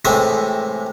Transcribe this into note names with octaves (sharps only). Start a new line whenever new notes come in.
A2 C3 E3 G#3 E5 D#6